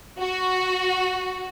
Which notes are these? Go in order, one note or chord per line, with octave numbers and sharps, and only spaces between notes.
F#4